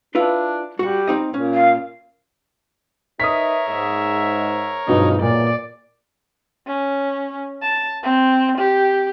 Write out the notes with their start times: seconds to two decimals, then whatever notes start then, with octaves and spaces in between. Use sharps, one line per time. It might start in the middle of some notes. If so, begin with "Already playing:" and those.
0.15 D4 E4 F4 B4
0.79 G3 F#4 F#5
1.07 C4 D#4 D#5
1.34 A#2 C#4
1.54 F5
3.20 D#4 A#4 B4 C#5 E5 D#6 B6
3.68 G#2 E5
4.88 G2 B2 F#3 G#3 C4 D#4 F4
5.22 B1 E2 A#2 A#3 D5
6.67 C#4
7.62 A5
8.03 C4
8.58 G4